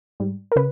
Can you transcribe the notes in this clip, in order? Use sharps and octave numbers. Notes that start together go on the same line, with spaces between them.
G#2 G3
A#4
C#3 B4